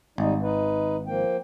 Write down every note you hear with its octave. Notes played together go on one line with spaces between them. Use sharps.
G#1 G3 D#4
D#4 B4
F3 A#3 G5